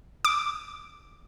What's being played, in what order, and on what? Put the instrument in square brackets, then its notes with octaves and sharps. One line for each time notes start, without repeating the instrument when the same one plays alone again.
[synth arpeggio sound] D6